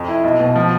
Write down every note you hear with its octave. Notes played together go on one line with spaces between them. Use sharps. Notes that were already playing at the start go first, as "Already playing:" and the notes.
Already playing: F2
E4
B1
B2
F3